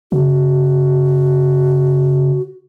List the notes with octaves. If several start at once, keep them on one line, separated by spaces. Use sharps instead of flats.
C#3 F#4